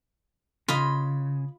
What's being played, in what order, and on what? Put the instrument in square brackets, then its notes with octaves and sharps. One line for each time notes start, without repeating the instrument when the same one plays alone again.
[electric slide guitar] C#3 [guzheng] F4 D#5 [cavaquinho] B5